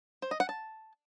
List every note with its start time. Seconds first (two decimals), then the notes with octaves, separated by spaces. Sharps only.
0.22 C5
0.31 D#5
0.40 F#5
0.49 A5